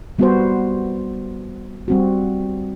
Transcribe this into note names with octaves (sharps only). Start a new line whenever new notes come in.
G3 B3 F#4 C5
G3 C4 F#4